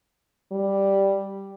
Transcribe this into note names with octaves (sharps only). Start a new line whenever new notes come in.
G3